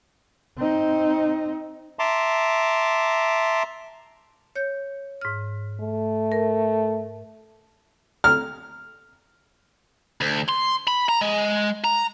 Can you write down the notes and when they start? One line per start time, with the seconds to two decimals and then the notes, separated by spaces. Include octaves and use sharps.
0.57 C4 D#4
1.99 E5 A5 A#5 C6 D6
4.55 C#5 G6
5.21 G#2 F6
5.80 A3
6.32 A#4
8.24 F6
10.21 D2
10.49 C6
10.88 B5
11.09 A#5
11.21 G#3
11.84 A#5